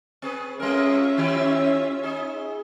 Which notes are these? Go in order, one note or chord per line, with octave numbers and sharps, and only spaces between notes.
C4 G#4 B4
G3 C#4 F4 A#4 E5
D#3 E4 G4
D#4 G#4